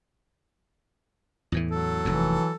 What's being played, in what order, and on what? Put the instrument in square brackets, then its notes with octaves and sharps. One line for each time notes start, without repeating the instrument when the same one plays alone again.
[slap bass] E2 A2 E3
[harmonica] F#3 A4
[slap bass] F1 D#2 [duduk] E3